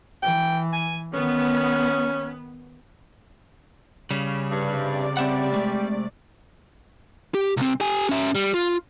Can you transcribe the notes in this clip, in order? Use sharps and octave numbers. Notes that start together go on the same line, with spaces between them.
E3 G5
G#5
D#3 B3 C#4
C#3 G3
G2 C3 D5
G3 C4 E5 F#5
G#3 A3
G4
C2 C4
G4 G#5
C#4 E5
G3
F4